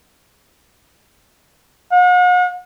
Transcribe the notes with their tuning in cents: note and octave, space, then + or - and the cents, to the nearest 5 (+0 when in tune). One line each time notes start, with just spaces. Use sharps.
F#5 -45